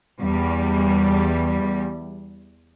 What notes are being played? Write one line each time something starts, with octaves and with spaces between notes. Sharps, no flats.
E2 G3